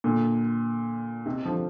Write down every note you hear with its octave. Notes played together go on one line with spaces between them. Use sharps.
A#2 D3
C3 D#3
D3 F3